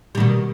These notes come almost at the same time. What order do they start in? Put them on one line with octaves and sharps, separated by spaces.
G3 D#3 B2